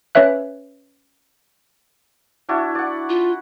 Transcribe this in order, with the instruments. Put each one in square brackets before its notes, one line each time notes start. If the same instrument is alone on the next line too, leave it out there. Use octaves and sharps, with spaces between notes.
[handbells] C#4 B4 C#5 E5 F#6
[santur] D4 E4 F#4
D5 F#5
[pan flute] F4